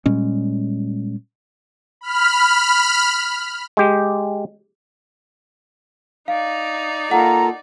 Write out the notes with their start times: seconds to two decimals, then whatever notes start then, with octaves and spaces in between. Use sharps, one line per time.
0.06 A#2 G3 G#3 C#4
2.01 B5 F6
3.77 G#3 G4
6.28 D#4 D5 F5
7.11 A#3 F4 A4 F#5 A#5